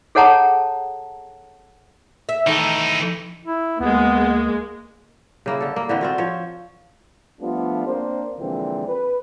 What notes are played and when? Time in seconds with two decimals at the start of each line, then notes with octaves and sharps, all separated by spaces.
0.15 G#4 A4 C#5 F#5 A5 A#5
2.29 E5
2.47 D#3 E3 A3 D#4
3.45 E4
3.80 D2 G#3 A#3 B3
5.46 C#3 A#3 E4
5.61 D3 A4
5.76 A#3
5.89 D3 E3 B3 C4
6.01 C4 F4 F#4
6.18 F3 C#5
7.41 F3 G3 A3 B3 D4 F4
7.86 A#3 C4 D4 C5
8.39 A#2 D3 E3 F3 G#3 C4
8.87 B4